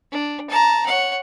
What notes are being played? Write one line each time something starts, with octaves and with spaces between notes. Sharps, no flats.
D4
A5 A#5
C#5 F#5